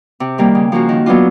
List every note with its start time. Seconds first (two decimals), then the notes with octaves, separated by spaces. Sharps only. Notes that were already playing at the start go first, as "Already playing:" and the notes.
0.20 C3
0.38 D#3 G3 A#3
0.55 C#3
0.72 F3 A#3 C#4 F#4
0.89 D#3
1.06 F#3 B3 D4 F4